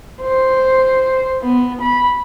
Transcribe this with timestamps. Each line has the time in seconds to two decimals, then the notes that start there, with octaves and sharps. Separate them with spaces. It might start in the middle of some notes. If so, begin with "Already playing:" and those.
0.22 C5
1.42 B3
1.81 B5